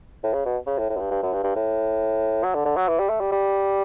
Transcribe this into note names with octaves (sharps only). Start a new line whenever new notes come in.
A2
C#3
B2
C#3
A2
A2
F#2
G2
G2
F#2
G2
G2
A2
F#3
D3
D3
F#3
E3
G3
A3
G3
G3